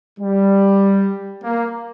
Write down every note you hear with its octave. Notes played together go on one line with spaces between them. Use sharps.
G3
A#3